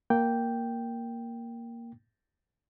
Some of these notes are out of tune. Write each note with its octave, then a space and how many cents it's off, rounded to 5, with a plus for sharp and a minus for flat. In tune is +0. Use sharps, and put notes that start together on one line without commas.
A#3 +0 G5 +0